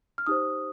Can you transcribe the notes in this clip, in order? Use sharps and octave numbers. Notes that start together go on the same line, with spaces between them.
F6
D#4 G4 C5 D#6